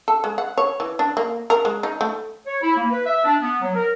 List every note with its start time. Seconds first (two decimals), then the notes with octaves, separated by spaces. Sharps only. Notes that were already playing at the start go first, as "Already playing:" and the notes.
0.08 A4
0.24 G#3
0.38 F#5
0.58 C#5
0.80 E3
0.99 D4
1.17 A#3
1.50 A#4
1.65 G#3
1.83 D#4
2.01 A3
2.46 C#5
2.62 E4
2.77 A#3
2.91 B4
3.06 E5
3.24 D4
3.41 B3
3.62 F#3
3.75 A#4